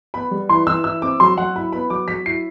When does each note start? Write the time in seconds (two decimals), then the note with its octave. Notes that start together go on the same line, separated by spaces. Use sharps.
0.14 B3 B5
0.31 G3
0.49 E3 C6
0.67 E3 E6
0.84 E4 E6
1.02 C4 D6
1.20 F#3 C6
1.37 F#3 F#5
1.56 E4 B5
1.73 B3 B5
1.90 F#3 D6
2.08 F#3 B6
2.26 E4 C7